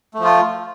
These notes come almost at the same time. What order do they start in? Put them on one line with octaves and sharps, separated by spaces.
A3 F3 F4